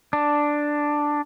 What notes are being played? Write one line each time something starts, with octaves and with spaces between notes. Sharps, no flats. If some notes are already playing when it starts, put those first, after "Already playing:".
D4